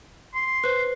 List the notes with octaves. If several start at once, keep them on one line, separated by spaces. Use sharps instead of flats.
C6
B4 C5